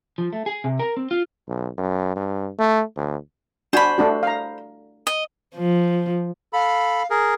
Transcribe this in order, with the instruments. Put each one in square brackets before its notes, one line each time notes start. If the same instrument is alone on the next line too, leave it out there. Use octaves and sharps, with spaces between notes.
[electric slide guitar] F3
A3
G#4
C3
A#4
C4
F4
[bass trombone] B1
F#2
G2
A3
D2
[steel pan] D4 F#4 G#5 [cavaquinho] C5 B5
[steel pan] A3 D4 F#4
F5 A#5
[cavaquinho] D#5
[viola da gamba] F3
[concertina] A4 B5 [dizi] F5
[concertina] G#4 A#4